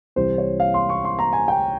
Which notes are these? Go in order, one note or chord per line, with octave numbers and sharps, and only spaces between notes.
C2 C3 E3 C5
C#5
F5
C6
C#6
C6
A#5
G#5
G5